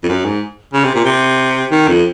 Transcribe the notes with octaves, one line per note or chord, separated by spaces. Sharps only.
F2
F#2
G#2
C#3
C3
A#2
C3
D#3
F2